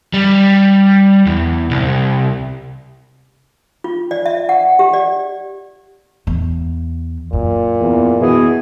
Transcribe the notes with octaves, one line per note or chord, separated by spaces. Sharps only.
G3
E2
C2
F4
D5
E5
F#5
G4
D5
E2
F#2 A#2
E2
B2 E3 G#4